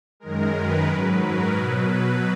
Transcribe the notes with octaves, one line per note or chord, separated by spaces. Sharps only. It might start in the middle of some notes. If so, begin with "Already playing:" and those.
F#2 D#3 G#3 A#4
B4
G#2 F#3 B4
A#4
B2 F#3 B4
B4